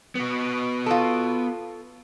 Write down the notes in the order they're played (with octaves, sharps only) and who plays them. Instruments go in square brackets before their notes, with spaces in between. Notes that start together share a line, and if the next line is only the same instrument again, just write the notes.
[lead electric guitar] B3 F#4
[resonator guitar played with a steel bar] F4 A4